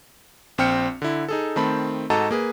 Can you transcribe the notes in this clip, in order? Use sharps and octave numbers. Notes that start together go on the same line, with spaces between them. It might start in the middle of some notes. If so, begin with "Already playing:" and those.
A#1 C4 G5 F6 C#7
D3 E4
D#4 G#4 A4
D#3 A3 C4 A5 B5
G#2 F#4 A4 D#5 A5 A#5
A#3 G#4 B4